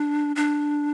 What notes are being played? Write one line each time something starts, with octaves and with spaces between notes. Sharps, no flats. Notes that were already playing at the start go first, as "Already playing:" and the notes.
Already playing: D4
D4